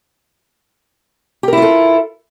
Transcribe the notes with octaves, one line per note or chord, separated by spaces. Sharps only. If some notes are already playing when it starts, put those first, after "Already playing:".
E4 F4 G4 A4 A#4